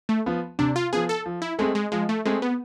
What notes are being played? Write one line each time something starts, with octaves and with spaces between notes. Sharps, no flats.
A3
F3 B3
C3 D4
F4
F3 B3 G#4
A4
F3
E4
G#3 A3 C4 G#4
G#3
F3 G#3
A3
G#3 A3 C4 G#4
B3